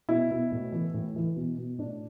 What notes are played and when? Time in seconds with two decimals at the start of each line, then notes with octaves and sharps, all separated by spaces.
0.09 B2 E4
0.31 B2
0.52 A2
0.72 E3
0.94 A2
1.16 E3
1.36 B2
1.58 B2
1.78 A2 D4